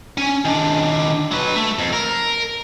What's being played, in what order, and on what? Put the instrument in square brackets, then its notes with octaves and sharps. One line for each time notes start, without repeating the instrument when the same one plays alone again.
[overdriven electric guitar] C#4 G#5
D#3 D4
F#3 B4
A3
F2
A#4